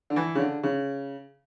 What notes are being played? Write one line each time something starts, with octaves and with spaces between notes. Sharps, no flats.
D3
E3
C#3
D3
C#3